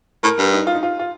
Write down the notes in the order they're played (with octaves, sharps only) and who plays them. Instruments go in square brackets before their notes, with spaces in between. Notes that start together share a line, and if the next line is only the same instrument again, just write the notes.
[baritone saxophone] A2 [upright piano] A#4
[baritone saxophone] G2
[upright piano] D#4
F4
D#4
F4
F4